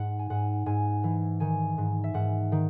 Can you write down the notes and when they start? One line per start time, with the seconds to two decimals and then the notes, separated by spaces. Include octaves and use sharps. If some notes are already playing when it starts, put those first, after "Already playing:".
Already playing: G#2 F#5
0.19 G#5
0.30 G#2 F#5
0.66 G#2 G#5
1.04 E3
1.40 D#3 G#5
1.78 G#2
2.04 E5
2.14 G#2 F#5
2.52 D#3